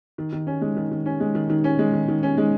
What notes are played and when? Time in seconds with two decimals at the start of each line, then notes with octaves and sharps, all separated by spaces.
0.18 D#3
0.33 D#3
0.47 C#4
0.61 G#3
0.77 D#3
0.91 D#3
1.06 C#4
1.20 G#3
1.35 D#3
1.50 D#3
1.64 C#4
1.79 G#3
1.93 D#3
2.08 D#3
2.23 C#4
2.38 G#3